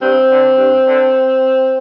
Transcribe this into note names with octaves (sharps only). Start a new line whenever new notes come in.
G2 C4
D3
G2
D3